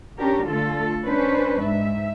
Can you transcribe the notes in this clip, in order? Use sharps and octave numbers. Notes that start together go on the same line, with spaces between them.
C#4 D4 G4 A#4
D3 A3 F4 A4
C#4 D4 B4 C5
G#2 E5